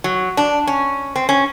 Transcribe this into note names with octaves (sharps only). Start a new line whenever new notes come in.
F#3
D4
C#4
C4
C#4